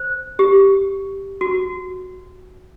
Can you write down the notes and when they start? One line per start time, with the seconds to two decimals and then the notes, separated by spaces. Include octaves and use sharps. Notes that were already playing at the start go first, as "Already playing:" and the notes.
Already playing: C5
0.39 G4
1.41 F#4